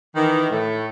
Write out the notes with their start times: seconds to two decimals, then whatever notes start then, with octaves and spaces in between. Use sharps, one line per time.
0.16 D#3 E3
0.51 A2 A3